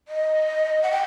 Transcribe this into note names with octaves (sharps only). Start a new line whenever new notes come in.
D#5
F#5
G5